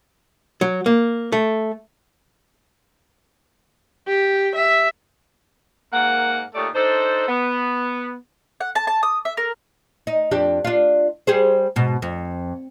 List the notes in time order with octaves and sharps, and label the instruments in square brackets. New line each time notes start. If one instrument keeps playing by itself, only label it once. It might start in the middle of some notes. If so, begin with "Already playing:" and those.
[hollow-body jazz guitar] F#3
A#3
A3
[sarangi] G4
E5
[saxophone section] G#2 A#3 A#4 F#5
A#2 A3 D#4 G4 C#5 D5
D4 D#4 A4 C5
B3
[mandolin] F#5
A5
A5
D#6
E5
A#4
[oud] D#4
F2 D4 G4
D4 F4
G3 G#4 C5
G#2 B2
F2